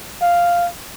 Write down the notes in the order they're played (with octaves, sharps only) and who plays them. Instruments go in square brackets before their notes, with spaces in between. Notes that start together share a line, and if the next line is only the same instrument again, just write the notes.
[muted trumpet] F5